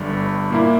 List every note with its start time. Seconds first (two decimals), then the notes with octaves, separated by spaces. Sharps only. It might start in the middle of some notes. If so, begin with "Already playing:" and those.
Already playing: G1 G2 D3 G3
0.50 A#2 A#3 E4